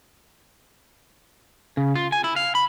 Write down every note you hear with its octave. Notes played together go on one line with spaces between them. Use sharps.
C#3
F4
G#5
E4
F5
B5